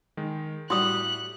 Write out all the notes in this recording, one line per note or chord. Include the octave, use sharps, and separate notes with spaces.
D#3 G#3
A2 G3 F#4 C6 D#6 F#6